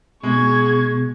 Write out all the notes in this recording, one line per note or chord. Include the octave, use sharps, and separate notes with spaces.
B2 G#3 G#4 C#6 G#6